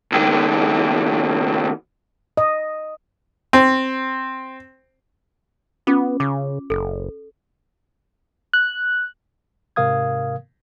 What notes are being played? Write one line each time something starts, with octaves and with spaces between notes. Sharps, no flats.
C#2 D#3
D#5
C4
B3 C#4 F4 D6
C#3 D6
F#1 A4
F#6
G#2 C3 A#4 F5 D#6 G#6